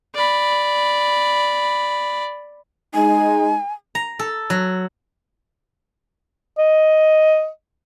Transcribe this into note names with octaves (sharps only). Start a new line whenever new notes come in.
D5 B5
G#3 D#4 G#5
A#5
A4
F#3
D#5